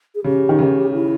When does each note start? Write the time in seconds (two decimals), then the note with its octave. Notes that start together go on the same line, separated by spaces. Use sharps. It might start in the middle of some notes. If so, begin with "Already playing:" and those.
0.15 G#4
0.24 C#3 G4
0.49 D#3
0.59 C#3
0.93 E4